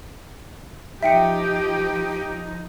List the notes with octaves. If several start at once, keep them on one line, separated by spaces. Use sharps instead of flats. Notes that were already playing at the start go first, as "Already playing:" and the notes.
F3 D#4 G4 E5 G5 C#7